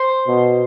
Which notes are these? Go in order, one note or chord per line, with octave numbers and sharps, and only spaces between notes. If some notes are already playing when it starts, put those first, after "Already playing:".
Already playing: C5
B2